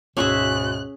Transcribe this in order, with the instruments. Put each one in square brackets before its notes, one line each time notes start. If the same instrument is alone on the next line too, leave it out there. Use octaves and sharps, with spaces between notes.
[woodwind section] D2 G#2 B2 [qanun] C#4 G#4 E5 [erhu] F#6